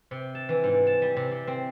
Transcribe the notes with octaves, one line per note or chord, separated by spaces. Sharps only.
C3
A5
E3
G#2
A5
G3
C3
C3
C4